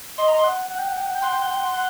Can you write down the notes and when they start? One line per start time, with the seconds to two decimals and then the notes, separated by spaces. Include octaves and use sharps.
0.18 D#5 C6
0.28 A#5
0.34 D#5 C6
0.44 F#5
0.70 F#5
0.79 G5
0.88 F#5
0.97 G5
1.06 F#5
1.15 G5
1.22 F#5 C6
1.32 G5
1.42 F#5
1.51 G5
1.60 F#5
1.73 F#5